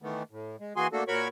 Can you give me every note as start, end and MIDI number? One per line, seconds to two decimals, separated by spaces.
0.02 0.23 51
0.02 0.23 52
0.02 0.23 57
0.02 0.23 59
0.31 0.56 45
0.60 0.73 56
0.76 0.87 52
0.76 0.87 58
0.76 0.87 66
0.76 0.87 68
0.76 0.87 80
0.76 0.87 84
0.93 1.04 57
0.93 1.04 58
0.93 1.04 62
0.93 1.04 66
0.93 1.04 69
1.08 1.28 46
1.08 1.28 66
1.08 1.28 70
1.08 1.28 73
1.08 1.28 83
1.08 1.28 85